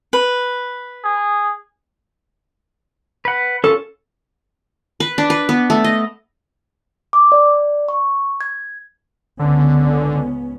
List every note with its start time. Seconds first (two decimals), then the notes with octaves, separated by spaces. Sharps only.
0.13 B4
1.04 G#4
3.25 B4 F#5
3.64 C#4 F4 A4
5.00 B4
5.18 D4
5.30 B4
5.49 B3
5.70 A3
5.84 D#5
7.13 D6
7.32 D5
7.88 C#6
8.41 G#6
9.39 C#2 D3 B3 C#4